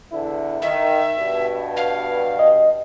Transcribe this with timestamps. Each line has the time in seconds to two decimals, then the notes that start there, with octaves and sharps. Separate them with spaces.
0.12 E2 D3 E4
0.62 D#3 E5
1.17 G2 B2
1.77 F5
2.39 D#5